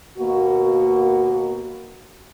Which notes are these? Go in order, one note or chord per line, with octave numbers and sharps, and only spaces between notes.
D#2 B2 A#3 F#4